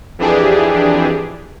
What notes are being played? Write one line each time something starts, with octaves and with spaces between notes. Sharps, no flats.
F2 E3 D4 G4 G#4